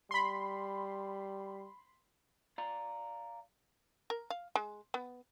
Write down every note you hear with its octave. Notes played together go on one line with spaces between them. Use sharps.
G3 B5 C6
D5 F5 A#5
A#4
F5
G#3
B3